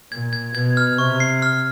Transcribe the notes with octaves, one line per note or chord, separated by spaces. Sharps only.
A#2 G#6
G#6
B2 G#6
F6
C3 C#6
C7
F6